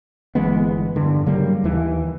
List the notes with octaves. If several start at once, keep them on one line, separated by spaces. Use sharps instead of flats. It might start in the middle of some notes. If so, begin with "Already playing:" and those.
G1 E3 G#3 B3
G2 D3
C#3 F#3 G3 A#3
D#2 E3